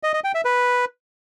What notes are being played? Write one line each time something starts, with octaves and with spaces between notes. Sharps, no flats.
D#5
D#5
G5
E5
B4